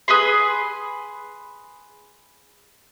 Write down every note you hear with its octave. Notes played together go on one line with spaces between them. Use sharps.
G#4 B4 G#5 C6